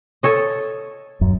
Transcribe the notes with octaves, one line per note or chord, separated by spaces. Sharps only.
A4 C#5 D#5
D#1 F#2